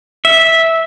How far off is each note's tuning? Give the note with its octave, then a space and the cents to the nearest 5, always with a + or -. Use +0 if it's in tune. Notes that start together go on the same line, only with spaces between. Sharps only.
E5 -10